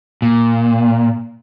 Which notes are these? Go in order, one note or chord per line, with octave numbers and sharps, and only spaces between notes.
A#2